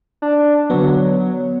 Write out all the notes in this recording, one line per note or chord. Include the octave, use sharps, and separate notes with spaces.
D4
D3 F#3 B3